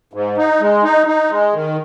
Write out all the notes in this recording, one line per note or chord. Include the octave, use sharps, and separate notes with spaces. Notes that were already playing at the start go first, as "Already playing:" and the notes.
G#2
D#4
G#3
D#4
D#4
G#3
D#3